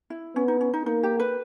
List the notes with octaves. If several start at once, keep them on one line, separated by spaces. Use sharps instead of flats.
E4
B3 C#4
D#4
C#4
D#4
A#3 D#4
G4
B4